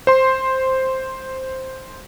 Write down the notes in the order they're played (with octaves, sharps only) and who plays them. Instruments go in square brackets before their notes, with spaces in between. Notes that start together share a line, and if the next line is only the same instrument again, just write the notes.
[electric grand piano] C5 C6